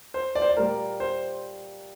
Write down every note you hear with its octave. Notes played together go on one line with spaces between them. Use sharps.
C5
D5
C5
D5
A#2 G3 A#3 A#4
C5